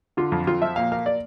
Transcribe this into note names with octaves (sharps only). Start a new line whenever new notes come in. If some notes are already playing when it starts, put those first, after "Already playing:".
D3 F4
F2
F2 F4
F3 E5
A#2 F5
A#3 F5
D5